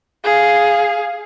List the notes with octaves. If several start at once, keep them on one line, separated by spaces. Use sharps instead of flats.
G#4 F5